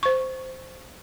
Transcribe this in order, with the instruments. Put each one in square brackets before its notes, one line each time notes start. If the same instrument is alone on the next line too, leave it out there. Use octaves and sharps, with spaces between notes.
[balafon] C5 C#6